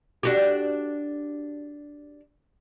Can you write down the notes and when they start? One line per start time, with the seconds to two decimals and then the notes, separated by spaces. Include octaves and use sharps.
0.23 D4 F#4 G4